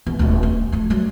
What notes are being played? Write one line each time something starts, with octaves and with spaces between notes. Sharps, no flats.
E2
D1 D2
C4
F3 A3
F#3 G3